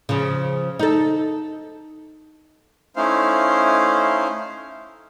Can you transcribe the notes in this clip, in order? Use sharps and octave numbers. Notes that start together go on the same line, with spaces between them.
C#3 F3
D#4 A4
A3 C#4 D#4 E4 C5 F5